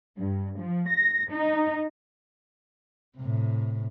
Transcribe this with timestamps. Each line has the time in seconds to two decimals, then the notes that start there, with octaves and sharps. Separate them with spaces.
0.18 G2
0.59 F3
0.89 A#6
1.32 D#4
3.17 A2 C3